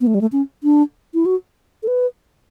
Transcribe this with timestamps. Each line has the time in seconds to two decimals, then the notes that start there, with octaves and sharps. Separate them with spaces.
0.01 B3
0.07 A3
0.15 G3
0.21 A3
0.32 C#4
0.64 D4
1.14 E4
1.26 F#4
1.83 A4
1.88 B4